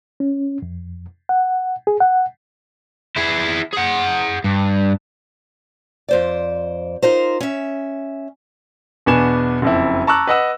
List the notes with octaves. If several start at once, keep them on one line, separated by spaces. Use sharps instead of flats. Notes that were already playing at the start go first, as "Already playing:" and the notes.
C#4
F2
F#5
G#4
F#5
E4 G#4
G#4 F#5
G2
F2 C5 D5
D#4 F4 A#4 C5
C#4 E5
E2 B2 B3 D4 G#5 E7
F#1 F2 E4
A5 A#5 C#6 D6 E6 F#6
B4 D#5 F#5 E6